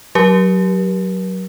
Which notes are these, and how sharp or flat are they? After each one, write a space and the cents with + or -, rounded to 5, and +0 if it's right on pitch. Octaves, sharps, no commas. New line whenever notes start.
F#3 +5 G4 -5 A#4 +45